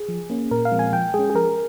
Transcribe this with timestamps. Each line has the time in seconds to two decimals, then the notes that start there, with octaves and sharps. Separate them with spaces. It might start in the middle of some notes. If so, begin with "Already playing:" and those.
Already playing: G#4
0.08 F3
0.30 A#3 C#4
0.51 A#2 A#4
0.65 F5
0.72 F3 G#3 C4
0.79 G#5
0.93 F3 G5
1.14 G#3 G#4
1.19 C#4
1.30 G#4
1.35 F3 A#4